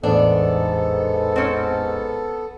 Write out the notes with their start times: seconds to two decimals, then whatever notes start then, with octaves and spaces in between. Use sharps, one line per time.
0.03 A1 E2 G#2 B3 D4 A4
1.36 C4 C#4